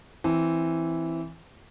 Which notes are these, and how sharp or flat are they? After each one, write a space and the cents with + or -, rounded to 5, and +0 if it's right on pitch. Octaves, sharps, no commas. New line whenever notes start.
E3 +0 C4 +0